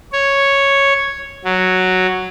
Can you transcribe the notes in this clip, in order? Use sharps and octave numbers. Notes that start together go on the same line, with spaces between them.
C#5
F#3